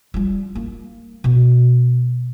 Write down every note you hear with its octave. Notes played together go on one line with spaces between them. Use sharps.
G3 F4
A#3
B2